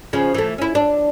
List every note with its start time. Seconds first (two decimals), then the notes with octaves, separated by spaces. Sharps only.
0.13 C#3 F3
0.34 E3 A3
0.58 C#4 E4
0.75 D4